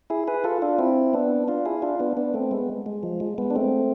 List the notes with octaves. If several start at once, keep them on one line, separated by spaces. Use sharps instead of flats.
E4 G#4
G#4 B4
F4 A4
D4 F4
C4 E4
B3 D4
D4 F4
E4 G#4
D4 F4
B3 D4
B3 D4
A3 C4
G#3 B3
G#3
F3
G#3
G#3 B3
D4
A3 C4